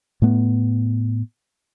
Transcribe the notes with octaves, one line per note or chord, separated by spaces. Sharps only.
A2 A3 B3